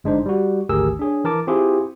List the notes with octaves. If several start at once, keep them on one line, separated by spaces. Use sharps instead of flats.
G1 G#3 D4 D#4 C5
G3 F#4
G#1 D2 G4 G#4 A#4 E6
D4 G#4 C#5
E3 A#4 A5 D6
C4 E4 F4 G4 G#4